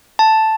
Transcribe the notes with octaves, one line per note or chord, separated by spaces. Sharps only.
A5